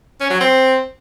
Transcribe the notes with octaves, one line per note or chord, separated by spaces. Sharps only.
C#4
F#3
C4